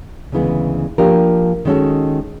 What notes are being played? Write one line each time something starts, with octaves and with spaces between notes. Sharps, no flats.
D2 C#3 E3 G#3 B3
F3 A#3 D4 G4 A#4
D#3 G#3 C#4 F#4 A4